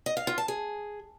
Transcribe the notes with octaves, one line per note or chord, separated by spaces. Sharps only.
D#5
F5
F4
A5
G#4